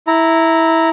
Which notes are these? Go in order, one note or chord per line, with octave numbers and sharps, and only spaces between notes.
E4 A#5